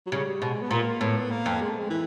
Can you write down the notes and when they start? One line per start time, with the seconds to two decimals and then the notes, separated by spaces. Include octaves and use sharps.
0.07 F#3
0.11 C#3 G3
0.41 B2 G#3
0.62 B3
0.71 A#2 A#3
1.01 A2 B3
1.31 A#3
1.46 F2
1.61 G#3
1.70 A3
1.79 G#3
1.90 E3